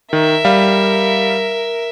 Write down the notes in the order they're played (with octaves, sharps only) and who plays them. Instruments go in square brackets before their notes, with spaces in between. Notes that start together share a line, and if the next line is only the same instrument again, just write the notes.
[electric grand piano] D#3 [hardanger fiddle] A#4 E5
[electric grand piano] G3 F5